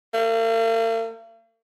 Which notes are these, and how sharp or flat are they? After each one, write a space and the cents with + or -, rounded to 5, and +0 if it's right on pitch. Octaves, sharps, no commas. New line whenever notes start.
A#3 -45